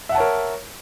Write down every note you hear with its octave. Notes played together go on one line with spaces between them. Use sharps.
A#4 C#5 E5 F#5 A5